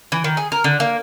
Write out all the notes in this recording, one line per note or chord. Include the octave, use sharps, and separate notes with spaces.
E3
D#3
G#4
A#4
D3
A#3